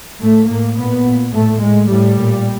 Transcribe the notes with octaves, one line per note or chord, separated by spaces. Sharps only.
A2 A3
A2 A#3
A#2 B3
A#2
A2 A3
A2 G#3
A2 G3
A#2